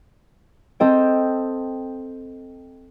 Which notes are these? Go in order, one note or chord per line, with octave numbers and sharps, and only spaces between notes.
C4 A4 D#5 G5